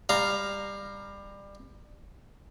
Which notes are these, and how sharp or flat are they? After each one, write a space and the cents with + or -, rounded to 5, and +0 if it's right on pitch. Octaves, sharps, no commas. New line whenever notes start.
G3 +25 F5 +0 A#5 +0